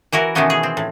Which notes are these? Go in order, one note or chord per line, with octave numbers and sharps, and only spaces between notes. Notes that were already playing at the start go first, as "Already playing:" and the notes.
E3 E4 F#4 A#4
B2 D#3 E3 A3 B3 C#4
G#4
C4
A2